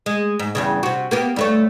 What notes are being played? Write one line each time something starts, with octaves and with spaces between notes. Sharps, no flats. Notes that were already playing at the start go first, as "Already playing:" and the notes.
G#3
G#2
E2 G2 C#3
C3 F#4
A#3 B3 G4
G2 A3 C#5